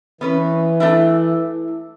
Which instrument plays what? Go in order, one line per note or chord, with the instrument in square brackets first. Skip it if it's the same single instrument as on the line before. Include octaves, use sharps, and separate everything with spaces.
[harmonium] E3 [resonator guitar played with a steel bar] B3 C#4 B4
[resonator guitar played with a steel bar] A3 D4 E4